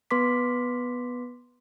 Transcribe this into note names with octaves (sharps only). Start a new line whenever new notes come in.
B3 B4 C6 D6 B6